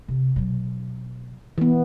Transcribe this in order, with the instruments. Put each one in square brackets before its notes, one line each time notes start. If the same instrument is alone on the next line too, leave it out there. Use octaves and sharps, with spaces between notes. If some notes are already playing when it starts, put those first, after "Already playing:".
[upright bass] C3
B2 F#3
[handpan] E3 B3